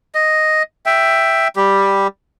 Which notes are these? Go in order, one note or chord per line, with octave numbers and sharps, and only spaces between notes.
D#5
E5 G5
G3 G4